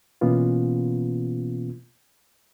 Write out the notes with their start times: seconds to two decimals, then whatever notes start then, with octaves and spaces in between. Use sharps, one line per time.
0.21 B2 E3 A#3 B3 C#4 F4